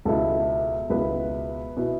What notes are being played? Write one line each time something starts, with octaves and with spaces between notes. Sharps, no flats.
C#2 B2 B3 E4 A4
C#2 B2 B3 E4 B4
B2 B3 E4